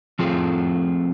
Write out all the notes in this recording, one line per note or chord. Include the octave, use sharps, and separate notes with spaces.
F3 A3 C4 F4 G#4